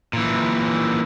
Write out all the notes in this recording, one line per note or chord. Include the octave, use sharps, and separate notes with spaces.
A#2 E3